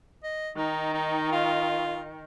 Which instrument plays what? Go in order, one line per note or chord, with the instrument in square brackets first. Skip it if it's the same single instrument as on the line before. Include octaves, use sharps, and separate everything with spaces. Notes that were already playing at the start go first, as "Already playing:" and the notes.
[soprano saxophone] D#5
[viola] D#3 [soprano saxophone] D#4
[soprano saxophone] D#4
F4